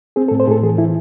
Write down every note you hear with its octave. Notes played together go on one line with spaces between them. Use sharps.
C4 G#4
A4
A2
C5
A2 G#4 A4
E3 G#4
E3 E4